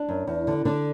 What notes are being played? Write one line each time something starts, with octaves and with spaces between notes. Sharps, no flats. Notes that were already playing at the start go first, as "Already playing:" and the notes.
Already playing: D4
F#2
E2
D3
D3 D4